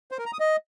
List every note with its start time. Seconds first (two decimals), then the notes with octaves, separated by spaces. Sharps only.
0.11 C5
0.19 A#4
0.26 A#5
0.33 D#6
0.40 D#5